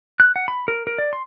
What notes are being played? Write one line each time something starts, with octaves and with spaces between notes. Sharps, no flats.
F#6
F#5
B5
A#4
A#4
D5
C6